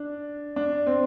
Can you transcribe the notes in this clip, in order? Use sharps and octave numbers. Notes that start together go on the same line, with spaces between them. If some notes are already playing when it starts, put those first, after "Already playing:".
Already playing: D4
D4
C4